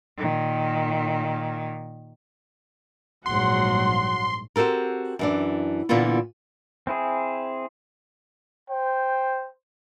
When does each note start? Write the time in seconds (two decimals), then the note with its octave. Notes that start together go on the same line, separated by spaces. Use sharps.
0.18 A#2 D#3
3.26 A#1 G#2 F#3 G3 F#5 C6
4.56 C4 F#4 G4 A4 A#4
5.19 F#2 E3 D4
5.89 A#2 D3 E3 A#3 B3 F4
6.87 C4 E4 G#4
8.70 C5 G5